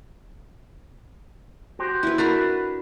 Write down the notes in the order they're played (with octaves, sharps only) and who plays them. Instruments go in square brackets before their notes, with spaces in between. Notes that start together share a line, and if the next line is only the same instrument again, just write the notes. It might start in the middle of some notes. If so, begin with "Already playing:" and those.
[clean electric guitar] F#4 G4 C5
[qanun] E4 B4
[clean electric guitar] D4 B4 [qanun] F#4 A#4 A#5